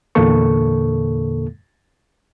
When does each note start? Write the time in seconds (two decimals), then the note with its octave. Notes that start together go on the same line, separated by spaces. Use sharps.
0.15 E2 A#2 D3 A#3 A4 C#6